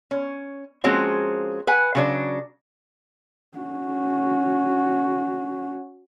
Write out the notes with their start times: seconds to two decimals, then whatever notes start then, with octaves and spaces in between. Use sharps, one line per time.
0.11 C#4
0.84 F3 G#3 A#3 C4 C#4 F#4
1.67 B4 F#5 G#5
1.95 C#3 F#3 D4
3.58 C#4 F#4